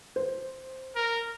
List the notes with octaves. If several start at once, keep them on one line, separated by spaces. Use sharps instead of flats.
C5
A#4